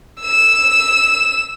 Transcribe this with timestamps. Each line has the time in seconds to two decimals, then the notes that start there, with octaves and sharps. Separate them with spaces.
0.22 E6 E7